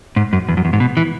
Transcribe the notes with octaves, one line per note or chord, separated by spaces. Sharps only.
G#2
F#2
E2
F#2
E2
G#2
B2
E3